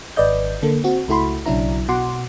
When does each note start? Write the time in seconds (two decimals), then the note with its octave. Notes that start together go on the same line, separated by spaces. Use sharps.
0.16 G#1 B4 D5 D#5 G6
0.63 D3 A#3 A4
0.84 C4 F#4
1.08 C#2 A3 E4 F#4 B5 C6
1.46 B1 C#3 F#3 D4 E4 A#5
1.88 B2 F#4 F#5 C6 D6